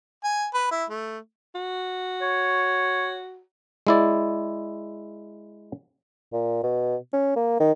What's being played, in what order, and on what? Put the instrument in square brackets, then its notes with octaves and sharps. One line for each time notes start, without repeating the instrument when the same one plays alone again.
[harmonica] G#5
B4
E4
A3
[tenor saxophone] F#4
[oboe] C#5
[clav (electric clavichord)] G#3 E4 D5
[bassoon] A#2
B2
C#4
A#3
D#3